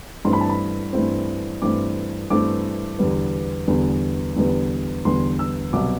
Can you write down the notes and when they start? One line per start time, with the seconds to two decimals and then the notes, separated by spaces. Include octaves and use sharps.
0.25 G2 E3 A3 C4 C6
0.33 B5
0.41 A5
0.49 B5
0.93 G2 E3 A3 C4
1.62 G2 E3 A3 C4 D6
2.30 G2 E3 A3 C4 D6
2.99 E2 D3 G3 B3
3.68 E2 D3 G3 B3
4.36 E2 D3 G3 B3
5.05 E2 D3 G3 B3 C6
5.39 E6
5.73 C2 B2 F#3 B3 D6